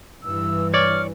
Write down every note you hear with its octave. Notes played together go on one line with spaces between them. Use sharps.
G2 E3 E6
C#5 D5 F6